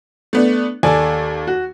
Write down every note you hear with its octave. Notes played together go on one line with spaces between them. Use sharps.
A3 B3 D4
D#2 A4 D5 G#5
F#4